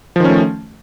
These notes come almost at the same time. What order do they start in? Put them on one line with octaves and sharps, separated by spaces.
F3 D#3 C#4 A3